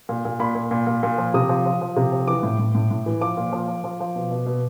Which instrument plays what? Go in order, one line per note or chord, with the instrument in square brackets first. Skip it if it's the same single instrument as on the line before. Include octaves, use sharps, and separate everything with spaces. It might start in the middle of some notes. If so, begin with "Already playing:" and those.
[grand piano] A#2
A#2
A#2 B5
A#2
A#2
A#2
A#2
F3
C3 D#6
F3
F3
F3
C3
F3
E3 D6
A2
A2
A2
A2
E3
F3 D6
A#2
F3
F3
F3
F3
B2
B2
B2